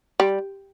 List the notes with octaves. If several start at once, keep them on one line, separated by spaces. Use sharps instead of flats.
G3